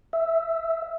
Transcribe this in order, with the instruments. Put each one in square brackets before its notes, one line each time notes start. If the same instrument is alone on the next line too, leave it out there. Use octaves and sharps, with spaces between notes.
[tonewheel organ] E5